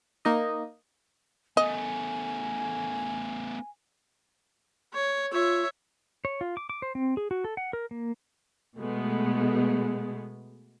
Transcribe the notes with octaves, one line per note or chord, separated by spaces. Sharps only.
A#3 D#4 D#5
A3 B3 D#5 G#5
C#5
F4 C#5 E5
C#5
F4
D6
D6
C5
C4
G#4
F#4
A4
F#5
A#4
A#3
B2 G#3 A3 B3